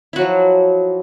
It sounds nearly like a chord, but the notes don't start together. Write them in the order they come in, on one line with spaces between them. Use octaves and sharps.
E4 F#4 F#3 F3